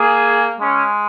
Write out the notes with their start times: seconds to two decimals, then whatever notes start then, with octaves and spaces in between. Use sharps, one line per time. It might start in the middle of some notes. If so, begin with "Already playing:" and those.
Already playing: A#3 G#4
0.60 G#3 C#4